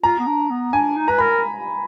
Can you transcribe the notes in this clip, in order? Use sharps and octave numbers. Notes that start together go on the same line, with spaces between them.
F4 A#5
B3
D4
B3
D4 G#5
D#4
B4 A#5
A#4 B5